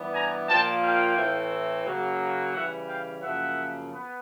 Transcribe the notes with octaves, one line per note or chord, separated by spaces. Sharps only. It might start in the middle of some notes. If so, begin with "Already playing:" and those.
Already playing: G2 E3 G3 B3
G#5 A#5
A#2 F3 A#3 G5 A5
F5 G5
A2 E3 A3 C4
C#3 F#3 A#3
C#3 E3 G3 E5 F#5
F5 G5
F#2 C#3 F3 A#3 E5 F#5
B3